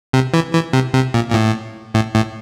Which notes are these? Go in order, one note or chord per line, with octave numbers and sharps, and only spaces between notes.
C3
E3
E3
C3
C3
A#2
A#2
A2
A2
A2